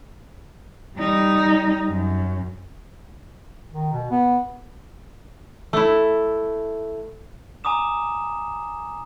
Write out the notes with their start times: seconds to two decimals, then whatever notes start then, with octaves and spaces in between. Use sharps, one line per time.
0.97 G3 D#4
1.88 F#2
3.73 D#3
3.92 B2
4.11 B3
5.73 A3 E4
7.64 G#5 A#5 D6 D#6 E7